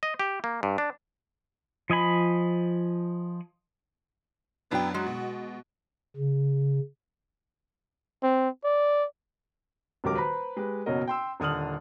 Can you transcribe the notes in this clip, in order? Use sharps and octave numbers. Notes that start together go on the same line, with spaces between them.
D#5
G4
A#3
G2
D4
F3 D#5 G#5 B5
F#2 B3 D4 E4 G5
G#3 F#4
B2
C#3
C4
D5
D#1 C#2 F#3 G4 A#4 D6
B4 C5 A#5 B5
G#3 G4 B4
F#1 B2 C#4 F#4 A#4 D#5
G5 C6 E6
D#1 D3 D#6 F6 F#7